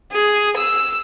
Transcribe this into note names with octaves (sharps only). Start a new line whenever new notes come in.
G#4
E6